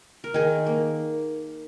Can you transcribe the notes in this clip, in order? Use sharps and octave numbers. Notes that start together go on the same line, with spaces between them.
A#4
D#3 D#4 G#4
A#3